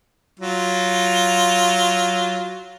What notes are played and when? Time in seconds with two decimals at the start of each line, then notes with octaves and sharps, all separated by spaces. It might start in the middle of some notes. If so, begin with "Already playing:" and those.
0.39 F#3 F4